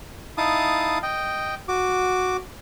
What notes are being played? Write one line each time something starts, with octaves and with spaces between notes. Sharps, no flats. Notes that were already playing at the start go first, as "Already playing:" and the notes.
D#4 E4 F5 A5 D#6
D#5 G5
F#4 D6